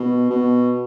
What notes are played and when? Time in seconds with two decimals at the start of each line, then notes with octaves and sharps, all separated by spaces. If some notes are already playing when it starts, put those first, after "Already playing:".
Already playing: B2
0.30 B2